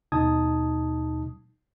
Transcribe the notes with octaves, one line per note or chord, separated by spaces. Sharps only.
D#2 B2 D#4 A5 D#6 G#6